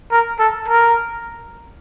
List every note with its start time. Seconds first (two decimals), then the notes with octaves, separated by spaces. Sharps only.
0.12 A#4
0.39 A4
0.68 A#4